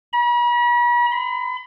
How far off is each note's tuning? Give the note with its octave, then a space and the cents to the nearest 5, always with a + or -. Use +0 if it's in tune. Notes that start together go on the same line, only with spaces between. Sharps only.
B5 -45
B5 +40